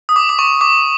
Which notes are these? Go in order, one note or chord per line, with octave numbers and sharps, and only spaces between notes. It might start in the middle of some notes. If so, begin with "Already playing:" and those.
D#6
D6
D6
C#6
D6